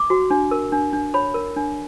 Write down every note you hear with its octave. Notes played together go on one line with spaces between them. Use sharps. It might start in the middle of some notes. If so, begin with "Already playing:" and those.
Already playing: D6
F#4
D4
A#4
D4
D4
C#5 B5
A#4
D4